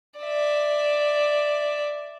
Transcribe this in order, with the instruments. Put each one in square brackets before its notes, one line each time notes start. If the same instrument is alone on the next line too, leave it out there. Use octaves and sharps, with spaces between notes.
[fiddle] D5 E5